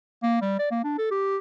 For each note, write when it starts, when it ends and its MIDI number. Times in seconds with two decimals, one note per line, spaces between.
0.23 0.39 58
0.42 0.58 55
0.59 0.68 74
0.71 0.84 58
0.84 0.97 62
0.98 1.07 69
1.11 1.38 67